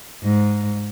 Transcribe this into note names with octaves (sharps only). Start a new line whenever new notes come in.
G#2